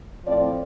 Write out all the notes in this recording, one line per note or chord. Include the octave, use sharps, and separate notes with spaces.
A2 F3 C4 D5